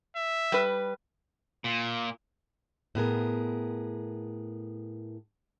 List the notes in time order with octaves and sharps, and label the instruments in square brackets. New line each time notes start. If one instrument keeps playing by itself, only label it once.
[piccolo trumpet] E5
[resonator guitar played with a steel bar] G3 B4
[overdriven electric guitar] A#2
[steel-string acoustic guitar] A2 B3 G#4 A#4